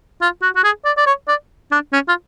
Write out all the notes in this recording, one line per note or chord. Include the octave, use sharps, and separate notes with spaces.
F4
F#4
F#4
G#4
D5
D5
C#5
D5
D4
C#4
F4